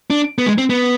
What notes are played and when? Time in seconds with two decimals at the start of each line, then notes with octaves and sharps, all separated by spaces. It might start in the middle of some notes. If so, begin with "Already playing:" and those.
0.10 D4
0.38 B3
0.46 G#3
0.58 C4
0.70 B3